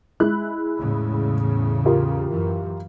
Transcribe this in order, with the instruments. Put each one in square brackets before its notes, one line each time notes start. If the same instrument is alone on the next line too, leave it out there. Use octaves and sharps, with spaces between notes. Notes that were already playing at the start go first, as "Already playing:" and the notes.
[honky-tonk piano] G#3 E4 F#6
[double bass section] E2 A2 C#3
[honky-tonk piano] F4 G4 A#4
[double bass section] F#2 E3